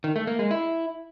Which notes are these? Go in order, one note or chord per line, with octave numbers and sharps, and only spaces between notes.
D#3
A3
A#3
G#3
E4